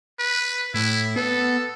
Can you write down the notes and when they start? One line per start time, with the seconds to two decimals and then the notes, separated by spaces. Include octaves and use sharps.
0.19 B4
0.74 A2 E4
1.16 B3 A4